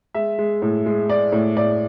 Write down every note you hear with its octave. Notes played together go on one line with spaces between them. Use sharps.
G#3 E5
G#3
A2
G#3
G#3 D5
A2
A2 D5